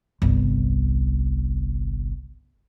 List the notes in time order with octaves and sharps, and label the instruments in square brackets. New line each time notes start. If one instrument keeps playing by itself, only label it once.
[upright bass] G1 C2